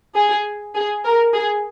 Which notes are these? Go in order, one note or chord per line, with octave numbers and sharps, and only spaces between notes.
G#4
G#4
A#4
G#4